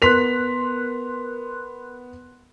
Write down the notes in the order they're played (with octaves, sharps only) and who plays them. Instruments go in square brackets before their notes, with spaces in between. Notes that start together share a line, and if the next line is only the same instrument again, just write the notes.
[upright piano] B3 B6 F7 [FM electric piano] A#4 C6 F#6